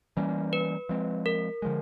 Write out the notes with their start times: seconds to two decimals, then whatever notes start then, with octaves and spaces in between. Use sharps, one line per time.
0.17 E3 G3 A#3 C#4
0.53 B4
0.89 F3 G#3 C4
1.26 A#4
1.62 D3 F3 G#3